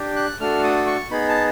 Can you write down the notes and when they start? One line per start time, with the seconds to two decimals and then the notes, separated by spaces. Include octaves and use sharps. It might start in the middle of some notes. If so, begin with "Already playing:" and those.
Already playing: D4 G4
0.16 F#6
0.40 A3 D4 F#4 A4 F6
0.64 D#6
0.87 C#6
1.11 B3 D#4 G#4 B5
1.29 A5